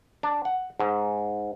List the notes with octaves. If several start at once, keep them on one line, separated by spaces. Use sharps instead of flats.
D4
F#5
G#2